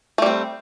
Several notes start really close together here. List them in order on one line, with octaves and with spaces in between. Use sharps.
A3 G3 C4